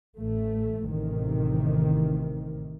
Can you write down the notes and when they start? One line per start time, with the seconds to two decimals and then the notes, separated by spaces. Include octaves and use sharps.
0.18 A1 A3
0.87 A1 C3 D#3